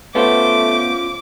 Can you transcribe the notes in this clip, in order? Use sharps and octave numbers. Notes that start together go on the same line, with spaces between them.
A3 B3 C#4 F4 C5 D6